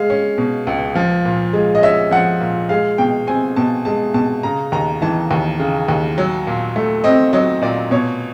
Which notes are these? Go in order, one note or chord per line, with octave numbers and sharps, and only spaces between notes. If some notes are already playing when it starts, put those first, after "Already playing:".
Already playing: G#3 F5
C#4
B2
C#2
F3
A#2
G#3
D#5
C#4 E5
F3 F#5
A#2
G#3 F5
B2 G5
C4 G#5
B2 A5
G#3 A5
B2 A5
C#3 A#5
D#2 A#5
E3 A5
D#2
C#3
D#2
F#3
A#2
A3
C4 D#5
F#3 D#5
A#2 D5
B2 C#5